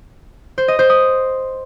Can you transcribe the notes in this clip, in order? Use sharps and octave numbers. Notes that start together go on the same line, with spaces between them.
C5
D#5
C5
D#6